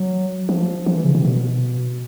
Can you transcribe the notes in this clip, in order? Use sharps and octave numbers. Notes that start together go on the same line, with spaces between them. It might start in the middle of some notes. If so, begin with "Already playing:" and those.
Already playing: F#3
F3
F3
E3
C#3
C3
B2